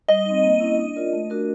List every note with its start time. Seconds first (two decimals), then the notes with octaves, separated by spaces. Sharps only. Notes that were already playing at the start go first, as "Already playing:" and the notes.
0.08 G3 D#5
0.25 C4 D#4
0.43 A#3
0.60 C#4 E4
0.78 D4
0.96 F4 A#4 D5
1.13 A3
1.30 D4 F#4 A#4